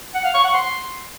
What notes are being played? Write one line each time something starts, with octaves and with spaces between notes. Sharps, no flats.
F#5
F5
C#6
F#5
C6